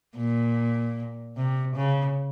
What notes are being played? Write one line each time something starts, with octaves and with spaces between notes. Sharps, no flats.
A#2
C3
C#3